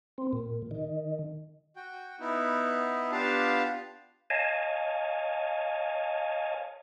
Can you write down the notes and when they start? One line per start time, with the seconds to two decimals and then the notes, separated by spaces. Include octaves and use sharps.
0.18 C4
0.33 A#2
0.71 D#3
1.76 F#4 G5
2.20 B3 D#4 E4
3.11 B3 D4 F4 G4 F5 A5
4.30 C#5 D#5 F5 G#5 A5